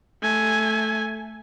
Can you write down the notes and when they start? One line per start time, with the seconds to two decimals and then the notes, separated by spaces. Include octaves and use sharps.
0.22 A3 G#5